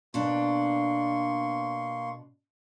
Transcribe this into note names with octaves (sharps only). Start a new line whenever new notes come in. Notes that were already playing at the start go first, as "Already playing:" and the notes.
B2 A#3 D4 C6 C#6